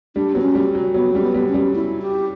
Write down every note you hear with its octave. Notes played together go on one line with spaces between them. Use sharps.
G3 D4
F#3 B3
C#4
G3
F#3
F#3 B3
G3 C#4
B3
G3
C#4
G3
E4
G4